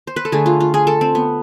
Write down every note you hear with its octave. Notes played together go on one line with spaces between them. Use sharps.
C5
B4
A4
D3 A3 G#4
F4
F4
G#4
A4
C4
B3